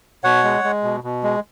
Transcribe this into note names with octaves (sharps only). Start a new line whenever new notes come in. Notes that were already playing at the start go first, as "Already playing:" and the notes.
B2 C#5 F#5
G#3
G#3
B2
B2
G#3